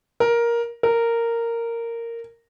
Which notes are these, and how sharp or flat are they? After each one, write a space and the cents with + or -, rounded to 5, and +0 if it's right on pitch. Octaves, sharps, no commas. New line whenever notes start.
A#4 +10
A#4 -10